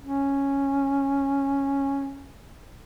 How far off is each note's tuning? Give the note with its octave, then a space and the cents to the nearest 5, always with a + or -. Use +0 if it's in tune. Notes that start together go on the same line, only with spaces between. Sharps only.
C#4 -5